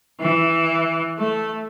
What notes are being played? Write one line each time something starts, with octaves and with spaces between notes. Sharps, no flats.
E3
A3